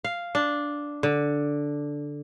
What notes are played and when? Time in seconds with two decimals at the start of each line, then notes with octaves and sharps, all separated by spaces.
0.04 F5
0.35 D4
1.03 D3